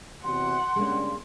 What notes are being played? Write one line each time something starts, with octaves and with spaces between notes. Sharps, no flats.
E2 C3 F#4 F#5 C6
C#3 G3 G#3 A#3 D4